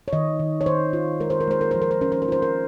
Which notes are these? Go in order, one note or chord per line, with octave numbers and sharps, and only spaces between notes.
C#5
D#3 D#5
D#3
C#5
D#3 C5
F4
G#3 A#4
C5
A#4
G#3 C5
A#4
F3 C5
A#4
C5
C#4 A#4
C5
A#4
F4 C5
A#4